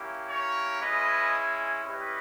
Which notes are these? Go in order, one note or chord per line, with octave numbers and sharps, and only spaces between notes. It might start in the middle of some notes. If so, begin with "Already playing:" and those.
Already playing: A#3 C#4 E4 G4
A#4 C#5
G#3 C#4 E4 B4 D#5
G3 C#4 E4 G4 B4 D#5